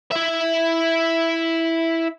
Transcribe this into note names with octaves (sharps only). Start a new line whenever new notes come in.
E4 E5